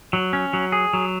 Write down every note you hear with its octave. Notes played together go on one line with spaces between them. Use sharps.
F#3
C#4
F#3
G#4
F#3